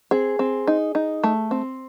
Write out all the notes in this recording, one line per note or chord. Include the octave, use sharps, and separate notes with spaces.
C4 G#4
C4
D#4
D#4
A3
C4